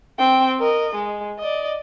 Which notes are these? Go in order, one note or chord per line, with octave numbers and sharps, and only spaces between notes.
C4 G5
A#4 D#5
G#3
D5 D#5